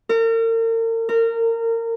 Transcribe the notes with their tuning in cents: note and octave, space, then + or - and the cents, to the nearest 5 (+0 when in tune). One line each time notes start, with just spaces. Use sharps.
A#4 -40
A#4 -25